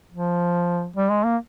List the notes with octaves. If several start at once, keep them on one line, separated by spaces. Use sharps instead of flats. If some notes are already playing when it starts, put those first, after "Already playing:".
F3
G3
G#3
A#3